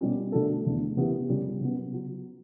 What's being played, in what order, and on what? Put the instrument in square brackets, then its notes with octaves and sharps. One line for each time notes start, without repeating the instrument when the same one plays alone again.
[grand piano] B2 G3 C#4 G4
D3 A3 D4 F#4 A4
E2 D3 A3
C#3 E3 B3 E4 G4
C#3 G3 C#4
C#3 F#3 B3
F#3